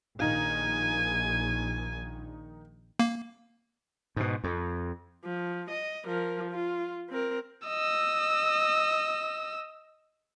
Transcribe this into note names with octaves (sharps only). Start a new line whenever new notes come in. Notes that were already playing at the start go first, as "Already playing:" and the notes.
A#1 D#3 D#4 F5 G#5
A#3
G#2 B2
F2
F3
D#5
F3 A#4
F4
C4 A#4
D#5 E6